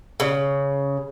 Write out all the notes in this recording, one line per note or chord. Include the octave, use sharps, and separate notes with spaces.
C#3